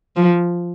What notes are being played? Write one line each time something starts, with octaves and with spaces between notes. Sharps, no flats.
F3